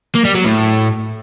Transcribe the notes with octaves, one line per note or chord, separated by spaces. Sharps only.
A#3
G3
F#3
A2